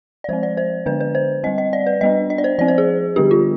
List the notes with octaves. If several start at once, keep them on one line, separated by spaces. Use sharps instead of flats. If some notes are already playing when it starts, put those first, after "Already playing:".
D5
F3 G#3 C4 C5
D5
C5
D3 G#3 B3 D4 B4
B4
C5
G3 C4 D#5
D#5
D5
B4
G3 B3 D4 D#5
D#5
D5
C5
F3 C4 D5
C5
G#4
D3 G3 B3 D4 G4
F4